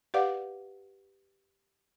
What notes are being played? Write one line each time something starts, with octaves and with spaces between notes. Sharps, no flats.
G4 B4 D5 F5 F#5 D6